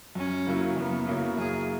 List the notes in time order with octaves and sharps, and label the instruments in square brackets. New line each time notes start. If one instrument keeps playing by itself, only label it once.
[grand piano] F#2 [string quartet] C#4
[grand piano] C#3 F#3 A#3 E4
[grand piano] F#2 [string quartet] B3
[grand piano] C#3 F#3 A#3 E4
[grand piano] F#2 [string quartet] G#4